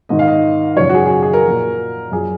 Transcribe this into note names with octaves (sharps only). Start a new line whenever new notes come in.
G#2 D#3 D#5
F5
D#5
F#2 C#3 F3 C#5
F#4
G#4
G#4
F#4
G#4
A#4
A#2 F3
F#2 F3 G#4